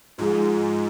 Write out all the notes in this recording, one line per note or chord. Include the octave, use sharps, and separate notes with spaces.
G#2 F3 G#3 F4 G#4